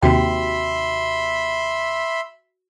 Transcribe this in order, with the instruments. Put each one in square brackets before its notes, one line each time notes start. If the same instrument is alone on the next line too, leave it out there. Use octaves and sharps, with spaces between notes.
[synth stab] D#2 C3 [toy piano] F#4 G5 [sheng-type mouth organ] E5 B5 C6